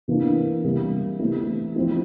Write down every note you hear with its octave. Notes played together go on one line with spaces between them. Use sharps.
C3 E3 A#3 D4
C3 G3 A#3
E3 A3 C4 E4
F3 C4 E4